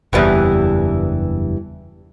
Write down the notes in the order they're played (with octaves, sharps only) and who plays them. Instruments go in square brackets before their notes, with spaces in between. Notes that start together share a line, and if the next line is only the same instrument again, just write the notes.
[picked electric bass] F#1 E2 [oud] G2 E3 G3